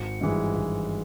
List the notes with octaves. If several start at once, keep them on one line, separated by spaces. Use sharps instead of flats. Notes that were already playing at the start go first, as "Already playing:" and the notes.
Already playing: G#1 C#7
G2 E3 G#3
G#1